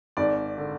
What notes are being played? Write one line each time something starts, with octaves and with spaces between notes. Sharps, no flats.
G#1 D5
D3